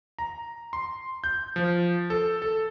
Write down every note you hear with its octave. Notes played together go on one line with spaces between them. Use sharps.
A#5
C6
G6
F3
A4
A4